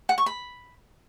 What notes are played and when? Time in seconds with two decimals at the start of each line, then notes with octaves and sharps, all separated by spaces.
0.09 F#5
0.18 C#6
0.26 B5